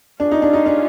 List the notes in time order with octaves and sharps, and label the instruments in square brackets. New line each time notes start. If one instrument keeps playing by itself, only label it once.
[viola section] C#4 F4 G#4 [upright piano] D4
[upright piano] D#4
D4
D#4
D4